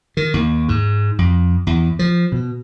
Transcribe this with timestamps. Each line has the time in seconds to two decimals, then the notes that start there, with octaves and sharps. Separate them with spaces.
0.17 D#3
0.34 D#2
0.68 G#2
1.18 F2
1.67 E2
1.99 F3
2.32 B2